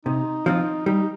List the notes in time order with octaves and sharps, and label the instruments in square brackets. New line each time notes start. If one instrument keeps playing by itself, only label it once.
[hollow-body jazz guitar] C3 [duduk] D#4
[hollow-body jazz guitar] F3 C4 F4 [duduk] D#4
[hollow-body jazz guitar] G3 [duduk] D#4